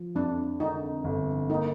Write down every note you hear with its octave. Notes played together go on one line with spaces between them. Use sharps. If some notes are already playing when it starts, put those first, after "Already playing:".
Already playing: F3
F2 D4
D3 D#4
G1
A#3 D#4